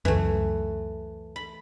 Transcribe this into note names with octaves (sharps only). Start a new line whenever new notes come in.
C#2 F#2 E3 A3
B5